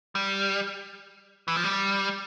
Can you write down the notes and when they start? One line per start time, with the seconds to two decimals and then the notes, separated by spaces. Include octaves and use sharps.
0.15 G3
1.48 E3
1.56 F3
1.63 G3